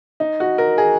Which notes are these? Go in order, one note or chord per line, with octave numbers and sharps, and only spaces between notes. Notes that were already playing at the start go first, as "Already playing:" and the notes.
D#4
F#4
A#4
G#4